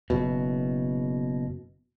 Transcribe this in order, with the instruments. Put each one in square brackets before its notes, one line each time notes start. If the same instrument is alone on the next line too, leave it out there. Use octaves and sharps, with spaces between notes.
[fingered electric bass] F#1 B2